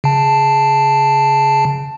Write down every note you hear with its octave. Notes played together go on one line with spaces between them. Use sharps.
C#3 A5